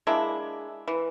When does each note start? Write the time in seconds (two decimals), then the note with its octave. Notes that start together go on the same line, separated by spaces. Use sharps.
0.07 G#3 A#3 D4 E4
0.88 E3